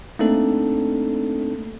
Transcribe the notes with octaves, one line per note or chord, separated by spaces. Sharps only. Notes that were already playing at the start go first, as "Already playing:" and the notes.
A3 A#3 C4 D4 D#4 A4